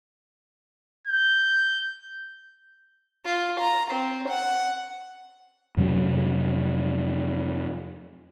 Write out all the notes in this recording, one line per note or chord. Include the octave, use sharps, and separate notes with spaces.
G6
F4
A#5
C4
F#5
F2 C3 F#3 C#4